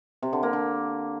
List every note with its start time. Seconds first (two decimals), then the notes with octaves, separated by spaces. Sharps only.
0.22 C3
0.33 D3
0.43 A#3
0.53 D3